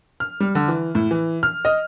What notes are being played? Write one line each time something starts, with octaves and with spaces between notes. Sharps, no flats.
F6
G3
D3
E3
A2
E3
F6
D#5